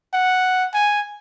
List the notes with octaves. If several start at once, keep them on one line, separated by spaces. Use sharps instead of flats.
F#5
G#5